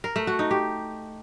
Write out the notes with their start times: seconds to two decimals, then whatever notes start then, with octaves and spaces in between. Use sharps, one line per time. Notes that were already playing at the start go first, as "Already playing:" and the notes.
0.04 A#4
0.16 A3
0.27 F#4
0.39 D#4
0.51 G4